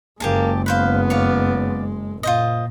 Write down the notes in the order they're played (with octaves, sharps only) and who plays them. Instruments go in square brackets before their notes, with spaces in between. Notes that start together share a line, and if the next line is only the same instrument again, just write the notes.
[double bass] F#1 G#3 [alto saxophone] A#3 [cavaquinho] G4 G#4 A5
[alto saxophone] B3 [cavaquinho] B4 C5 F5
[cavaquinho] C#5 D5 F5
[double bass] A#2 [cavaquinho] F4 C5 D#5